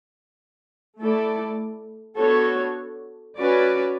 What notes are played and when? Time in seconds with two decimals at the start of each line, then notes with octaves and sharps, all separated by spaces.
0.98 A3 E4 A4 D5
2.18 B3 D4 F#4 A4 C#5
3.38 C#4 F#4 B4 D5